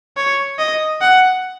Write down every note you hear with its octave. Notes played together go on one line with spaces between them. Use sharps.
C#5
D#5
F#5